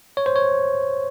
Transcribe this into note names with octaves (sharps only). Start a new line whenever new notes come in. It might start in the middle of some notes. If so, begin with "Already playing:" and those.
C#5
C5
C#5